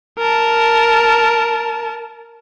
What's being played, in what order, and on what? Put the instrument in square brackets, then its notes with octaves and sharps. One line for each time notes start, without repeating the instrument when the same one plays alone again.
[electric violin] A#4 A5